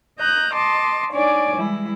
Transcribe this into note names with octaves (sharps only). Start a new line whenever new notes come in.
D#5 A#5 F#6 G6
D#5 A5 C6 D6
D4 D#4 C#5 D5 G#5 D6
E3 G3 G#3 E4